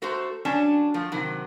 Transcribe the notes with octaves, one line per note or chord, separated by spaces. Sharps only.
A3 F#4 A4 C5 A#5
F#3 C#4 D4 A5
F3 A3
C3 D#3 F#3